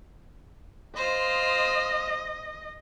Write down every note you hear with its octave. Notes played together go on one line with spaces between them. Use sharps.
F4 C5 D#5